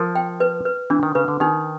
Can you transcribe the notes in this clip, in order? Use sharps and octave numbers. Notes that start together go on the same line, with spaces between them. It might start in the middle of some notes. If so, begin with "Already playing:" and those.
Already playing: F3 A#4
G5
B4
B4
E3 D4
D#3
C#3 B4
D3
D#3 D#4